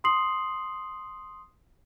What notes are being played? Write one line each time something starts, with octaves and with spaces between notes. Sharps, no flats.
C6 D#6 C7 F#7